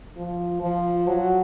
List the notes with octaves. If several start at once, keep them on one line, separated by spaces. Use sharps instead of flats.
F3
F3
F#3